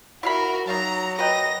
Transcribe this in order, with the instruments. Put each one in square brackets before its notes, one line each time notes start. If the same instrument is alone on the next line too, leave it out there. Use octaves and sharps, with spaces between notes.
[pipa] E4 F5 B5 [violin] F#4 A#4
[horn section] F#3 [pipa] D#4 F5 A5 [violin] A#5
[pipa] A#4 B4 G5 [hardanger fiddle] D#5 [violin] A#6